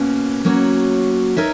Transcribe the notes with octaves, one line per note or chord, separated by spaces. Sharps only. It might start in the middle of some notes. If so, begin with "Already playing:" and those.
Already playing: B2 A#3 C#4
F#3 A#3 C#4 F#4 C#5
D#4 A#4 C#5 E5